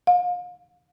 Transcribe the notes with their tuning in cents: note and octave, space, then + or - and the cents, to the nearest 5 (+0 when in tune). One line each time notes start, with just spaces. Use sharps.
F5 +40